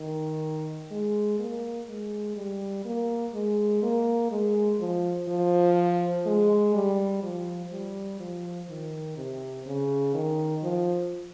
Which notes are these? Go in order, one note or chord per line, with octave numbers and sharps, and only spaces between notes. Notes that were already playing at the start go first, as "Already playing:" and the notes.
Already playing: D#3
G#3
A#3
G#3
G3
A#3
G#3
A#3
G#3
F3
F3
G#3
G3
F3
G3
F3
D#3
C3
C#3
D#3
F3